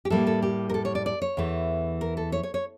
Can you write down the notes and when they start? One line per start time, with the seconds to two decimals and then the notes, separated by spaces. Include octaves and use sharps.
0.05 G4
0.10 A2 G3 A#3 A4
0.27 A4
0.42 G4
0.70 A#4
0.74 A4
0.85 C#5
0.95 D5
1.06 D5
1.22 C#5
1.37 E2 E3 A3
2.01 A#4
2.17 A4
2.32 C#5
2.43 C#5
2.54 C#5